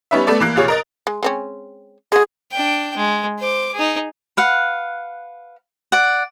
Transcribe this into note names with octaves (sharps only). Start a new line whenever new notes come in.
G3 B3 C#4 D#4 B4 E5
A3 B3 A4 D5
E3 A#3 F#6
A#1 C3 F4 G#4 C#5
A#4 D#5 A6
G#3
G#3 C4 C#4
G#3 F#4 G#4
D4 G5
G#3
C5 D6
D#4 G#4
B4 F5 F#5
D5 F#5